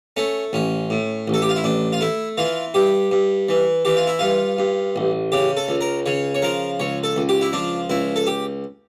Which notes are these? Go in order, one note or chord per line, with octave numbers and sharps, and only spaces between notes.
A3 C#4
A1 C#4
A2
A1
A4
G4
F4
E4
A1 D4
F4
A3 E4
E3 F4
G2 G4
G2
E3
E3 G4
F4
E4
G2 F4
G2
A1
C#3 G4
A4
C#2
A#4
C#3 C#5
C#5
F3 A#4
C#2 C#5
A4
C#2
G4
E4
F3 D4
C#2 E4
A4
G4